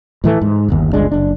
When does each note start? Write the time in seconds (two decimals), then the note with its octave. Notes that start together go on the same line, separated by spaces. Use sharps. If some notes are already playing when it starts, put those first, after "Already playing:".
0.24 A2 E3 A3
0.42 G#2
0.69 D1 G1 D#2
0.93 G1 C#2 G#3 D4
1.12 F#1 D4